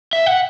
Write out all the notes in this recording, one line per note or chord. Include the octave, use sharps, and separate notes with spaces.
E5
F#5